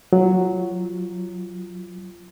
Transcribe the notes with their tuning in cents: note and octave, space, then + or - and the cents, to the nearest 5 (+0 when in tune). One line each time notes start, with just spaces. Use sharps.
F#3 +0 F4 -20